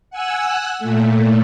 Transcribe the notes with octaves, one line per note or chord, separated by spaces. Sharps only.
F#5 G#5 E6 F#6
A#2 A3